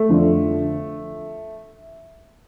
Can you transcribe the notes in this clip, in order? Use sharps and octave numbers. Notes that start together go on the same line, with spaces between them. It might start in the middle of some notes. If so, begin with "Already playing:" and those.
Already playing: A3
F2 D3 F3